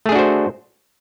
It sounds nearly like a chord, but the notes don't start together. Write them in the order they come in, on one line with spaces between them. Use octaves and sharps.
A3 G#4 D4 F#4 C5